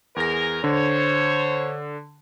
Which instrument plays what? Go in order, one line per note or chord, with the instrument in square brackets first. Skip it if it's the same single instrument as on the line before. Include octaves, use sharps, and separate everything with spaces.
[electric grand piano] E2 A#6 [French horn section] G#4 A#4
[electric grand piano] D3 [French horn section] C5 C#5